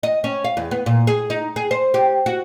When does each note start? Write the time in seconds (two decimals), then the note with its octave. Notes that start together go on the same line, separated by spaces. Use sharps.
0.03 D#5
0.24 C#4
0.44 F5
0.57 E2
0.71 B3
0.86 A#2
1.07 G#4
1.30 D#4
1.56 G#4
1.71 C5
1.94 G4
2.26 F#4